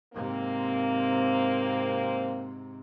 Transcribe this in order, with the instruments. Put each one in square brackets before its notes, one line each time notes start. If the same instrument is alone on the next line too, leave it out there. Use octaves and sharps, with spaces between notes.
[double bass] G#2 C3 [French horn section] A#3 C4